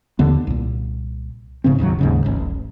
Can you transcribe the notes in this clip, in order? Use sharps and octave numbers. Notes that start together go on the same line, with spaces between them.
D#2 D3 B3
C2 A#2
F1 G#2 C#3 C4
E1 D#2 A#2 F#3
D#2 G#2 C#3
D#1 A1